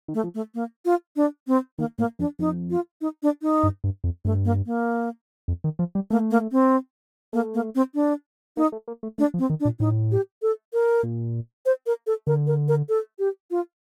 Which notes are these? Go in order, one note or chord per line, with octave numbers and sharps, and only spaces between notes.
D#3
A3
F3
A3
A#3
F4
D4
C4
D#3 A#3
A2 A#3
F2 D4
F2 D#4
F4
D#4
D4
D#4
G2
G2
F2
G2 A3
A#3
A#3
F2
D#3
F3
G3
A3 A#3
A#3
C4
A3 A#3
A#3
C4
D4
A#3 D#4
A3
A#3
A3
A3 D4
F3
C4
D#3
D4
A#2
A2 D#4
G4
A4
A#4
A#2
C5
A#4
A4
D3 A#4
A#4
A#4
A4
G4
F4